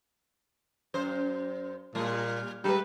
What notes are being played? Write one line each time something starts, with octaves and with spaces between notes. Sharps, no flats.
F#2 C5
A#2 G3
G3 G#3 B4